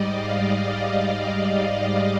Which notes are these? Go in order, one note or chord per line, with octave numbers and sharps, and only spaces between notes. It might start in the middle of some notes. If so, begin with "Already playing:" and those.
Already playing: G#2 G3 D5 D#5
F5
F5
D5
F5